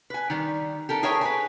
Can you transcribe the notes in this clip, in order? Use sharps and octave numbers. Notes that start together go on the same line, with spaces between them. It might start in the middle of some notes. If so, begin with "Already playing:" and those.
B4 G#5
D#3 G3
G4 A4 A#4
G#4 A#4 B4 C#5 E5 G5
B4 G#5